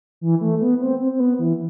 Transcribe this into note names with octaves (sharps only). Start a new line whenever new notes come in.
E3
A3
B3
C4
C4
C4
B3
E3